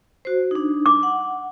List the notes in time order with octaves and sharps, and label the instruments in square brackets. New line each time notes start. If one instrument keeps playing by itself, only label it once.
[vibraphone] F#4 C5
D4 D#4
[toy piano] D6
[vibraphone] F#5